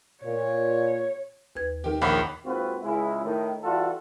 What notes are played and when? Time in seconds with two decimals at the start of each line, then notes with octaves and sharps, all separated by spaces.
0.25 A#2 C#5
1.56 D#2 B4 G#6
1.84 D#3 G4
2.02 A#1 D#3 C#5 F#5 B5 D6
2.45 G#1 D#2 C4 F4 F#4 B4
2.83 C#2 G#3 E4
3.24 A2 D#3
3.63 E3 G3 F4 F#4 A4